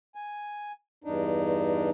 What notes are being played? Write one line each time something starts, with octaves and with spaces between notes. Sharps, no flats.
G#5
E2 G2 D4 D#4